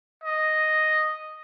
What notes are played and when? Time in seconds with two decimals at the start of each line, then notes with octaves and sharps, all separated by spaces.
0.24 D#5